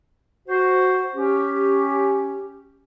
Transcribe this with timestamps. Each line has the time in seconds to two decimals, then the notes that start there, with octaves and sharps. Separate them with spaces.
0.47 F#4 C5
1.15 C#4 G4